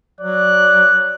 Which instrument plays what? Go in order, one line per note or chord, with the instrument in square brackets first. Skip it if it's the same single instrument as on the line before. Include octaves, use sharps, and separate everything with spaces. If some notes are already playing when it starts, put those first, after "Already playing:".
[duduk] F#3 [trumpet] D5 [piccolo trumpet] F#6